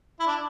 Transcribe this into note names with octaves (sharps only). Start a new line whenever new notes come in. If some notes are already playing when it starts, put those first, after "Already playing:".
E4
D4